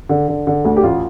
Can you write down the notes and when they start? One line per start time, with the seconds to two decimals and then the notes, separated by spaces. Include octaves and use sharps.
0.09 D3
0.28 D3
0.47 D3
0.65 D2
0.77 G4
0.83 A1 F4